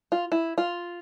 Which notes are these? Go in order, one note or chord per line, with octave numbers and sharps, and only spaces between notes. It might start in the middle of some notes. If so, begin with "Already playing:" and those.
F4
E4
F4